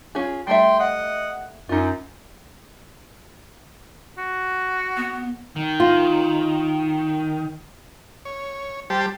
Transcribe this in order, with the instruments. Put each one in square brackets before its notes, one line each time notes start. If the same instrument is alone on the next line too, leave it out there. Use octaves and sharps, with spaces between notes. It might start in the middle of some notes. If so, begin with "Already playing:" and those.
[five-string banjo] C#4 F4 G#4
[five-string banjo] G3 A3 E5 [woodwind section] G5 C6
[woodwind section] D#5 F#5
[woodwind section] F#2 [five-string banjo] D#4 F4
[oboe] F#4
[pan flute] B3
[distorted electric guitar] D#3
[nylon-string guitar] F4
[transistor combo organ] C#5
G3 G4 C5 A5